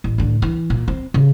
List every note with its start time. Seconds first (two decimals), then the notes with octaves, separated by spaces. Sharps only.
0.04 A1
0.18 A2 D3
0.42 E3
0.70 A#2
0.88 C4
1.14 C#3